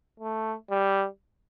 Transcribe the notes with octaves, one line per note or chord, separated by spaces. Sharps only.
A3
G3